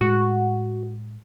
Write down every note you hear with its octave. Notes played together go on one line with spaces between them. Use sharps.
A2 G#3 F#4